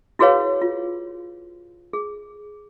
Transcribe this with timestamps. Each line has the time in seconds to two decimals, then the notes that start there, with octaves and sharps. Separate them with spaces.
0.19 E4 F#4 G#4 B4 C#5 F5
0.62 F4
1.93 G#4